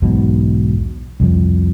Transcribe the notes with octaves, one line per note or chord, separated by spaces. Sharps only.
B1 E2 G#2 B2
C2 F2